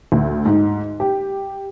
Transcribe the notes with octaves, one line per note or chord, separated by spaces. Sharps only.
D2
G#2
G4